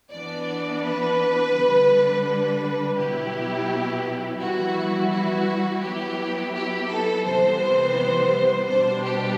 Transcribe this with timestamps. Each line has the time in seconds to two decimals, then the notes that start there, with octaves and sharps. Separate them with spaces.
0.11 E3 B3 D4 D5
0.82 B4
1.53 D3 G3 D4
2.25 B4
2.97 B2 F#3 B3 E4 G4
4.39 E3 G3 B3 E4 F#4
5.11 F#4
5.82 F#3 B3 E4 G4
6.54 G4
6.89 A4
7.25 C3 E3 G3 B3 C5
8.68 B2 G3 D4 C5
9.04 G4